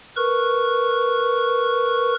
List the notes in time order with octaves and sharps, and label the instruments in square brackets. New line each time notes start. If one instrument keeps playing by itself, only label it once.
[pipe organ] A#4 B4 C#6